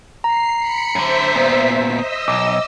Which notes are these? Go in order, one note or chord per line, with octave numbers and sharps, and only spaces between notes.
A#5 C7
B5 C#7
F#2 D3 C5 E5 B6
A#2 B3
D#5 E6
B1 D6